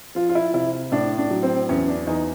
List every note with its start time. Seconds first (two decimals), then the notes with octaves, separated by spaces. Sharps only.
0.15 F3 F4
0.29 F4
0.35 E4
0.54 C3 E4
0.92 A2 D4
1.18 D4
1.30 F#3
1.43 C4
1.69 E2 C#4
1.88 D4
2.07 E2 D#4